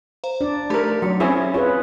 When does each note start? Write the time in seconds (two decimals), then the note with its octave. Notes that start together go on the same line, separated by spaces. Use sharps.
0.24 C5 F5 A#5
0.41 D4 D5
0.70 A3 D#4 G4 A#4 B5
1.02 F#3 B6 C#7
1.20 C4 C#4 E4 G#4 C5 C#5
1.54 F4 G#4 B4 C#5